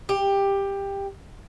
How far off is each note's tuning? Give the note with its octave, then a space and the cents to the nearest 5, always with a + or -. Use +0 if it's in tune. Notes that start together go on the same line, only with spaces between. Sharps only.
G4 +15